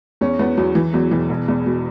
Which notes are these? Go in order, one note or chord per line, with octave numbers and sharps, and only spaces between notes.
E2 C#4
E2 B3
E2 F#3
E3
E2 F#3
E1 E3
E1
E2
B2